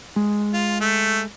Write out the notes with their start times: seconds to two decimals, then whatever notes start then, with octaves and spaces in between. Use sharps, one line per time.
0.16 G#3
0.54 F4
0.81 A3